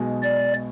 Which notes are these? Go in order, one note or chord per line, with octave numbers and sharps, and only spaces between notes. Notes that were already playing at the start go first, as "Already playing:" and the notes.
Already playing: B1 B2 G#3
D5